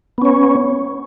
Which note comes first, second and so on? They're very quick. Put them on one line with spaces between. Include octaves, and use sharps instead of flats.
B3 C#4 C#5